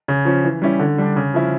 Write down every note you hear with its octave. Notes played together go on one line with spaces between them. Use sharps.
C#3
F3 C#4
E3
G3 C#4 E4
D3
G3 D4
C#3
F3 C#4 E4